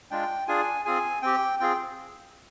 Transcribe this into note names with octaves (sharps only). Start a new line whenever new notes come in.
G#3 D4 F4 G5
D4 F4 G#4 G#5
C4 F4 G#4 G#5
C4 G4 G5
C4 F4 G#4 G5